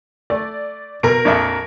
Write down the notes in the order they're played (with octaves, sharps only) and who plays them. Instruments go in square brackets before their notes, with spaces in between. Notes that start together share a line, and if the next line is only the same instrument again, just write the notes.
[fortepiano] A3 [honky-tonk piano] D5
[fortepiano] B2 [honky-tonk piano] A#4 D7
[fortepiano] A#1 F2 E5